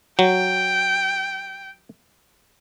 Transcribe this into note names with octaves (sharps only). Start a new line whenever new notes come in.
F#3 G5